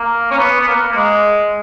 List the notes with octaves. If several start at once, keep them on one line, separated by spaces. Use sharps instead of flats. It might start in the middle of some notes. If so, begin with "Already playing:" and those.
Already playing: A#3
C#4
B3
B3
A#3
A#3
G#3